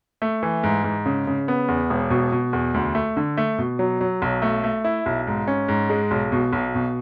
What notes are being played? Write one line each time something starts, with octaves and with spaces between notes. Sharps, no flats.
A3
E3
G#2
G#2
C#3
C#3
B3
E2
E1
B2
B2
E2
D2
A3
D3
A3
B2
F#3
F#3
B1
A3
A3
E4
B1
G#2
C#4
G#2
G#3
B1
B2
B1
B2